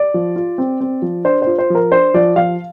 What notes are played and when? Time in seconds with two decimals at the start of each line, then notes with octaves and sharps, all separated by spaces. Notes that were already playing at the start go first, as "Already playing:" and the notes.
Already playing: D5
0.14 F3
0.36 F4
0.58 C4
0.81 C4
1.02 F3
1.25 D4 C5
1.42 F4 C5
1.58 C5
1.70 F3 A#4
1.92 D4 C5
2.14 F3 D5
2.36 F3 F5